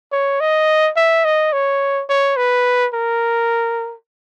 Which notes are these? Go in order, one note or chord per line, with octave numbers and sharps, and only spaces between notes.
C#5
D#5
E5
D#5
C#5
C#5
B4
A#4